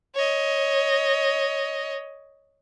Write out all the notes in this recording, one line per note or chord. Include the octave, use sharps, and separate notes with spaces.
C#5 D#5